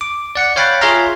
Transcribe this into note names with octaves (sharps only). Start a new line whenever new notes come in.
D6
D5 F#5 C#7
C#5 F5 G5 B5 F#6 A6
F4 G#4 C#5 E5 F5 A#5